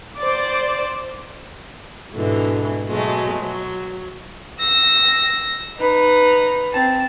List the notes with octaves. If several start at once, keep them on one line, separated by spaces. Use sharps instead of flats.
C5 D5 D6
G#2 B2 D3 E3
B2 F#3 G#3 A3
F#3
E6 A#6
D#4 B4
C4 A5